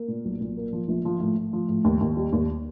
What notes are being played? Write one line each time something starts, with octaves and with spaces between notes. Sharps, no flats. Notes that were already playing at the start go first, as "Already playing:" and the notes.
Already playing: A#3
A#2
B1
A#2
A#3
F3
A#1
F3
A2
A2
F3
A2
D#2
D#2
G3
D#2